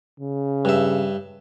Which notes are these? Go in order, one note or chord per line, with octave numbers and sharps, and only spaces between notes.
C#3
G2 E5